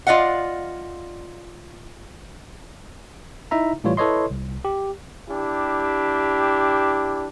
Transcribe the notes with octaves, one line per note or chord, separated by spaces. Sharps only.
F4 D5 D#5 F5 F#5
D#4 E4 E5 A#5
A2 E3 G3 F4 C#5
E4 A4 B4 C#5 D#5 C6
C2
G4
D4 E4 G4